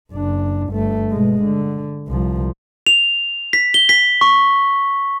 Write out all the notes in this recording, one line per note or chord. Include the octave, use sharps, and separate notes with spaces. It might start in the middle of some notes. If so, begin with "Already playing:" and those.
F#1 D4
G1 A3
B2 G#3
D3
C2 F3
F7
B6
G7
B6
C#6